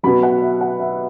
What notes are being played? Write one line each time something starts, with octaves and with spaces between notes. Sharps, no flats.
B2 F#3 B5
F#5
E5
F#5
E5